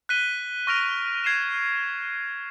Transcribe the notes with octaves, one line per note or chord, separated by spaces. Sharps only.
F#6 B6 D#7 G7
C#6 F6 A#6 D7 F7
G#6 C7 E7